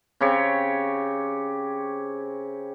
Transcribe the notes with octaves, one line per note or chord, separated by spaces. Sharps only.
C#3 C4 G4 C#5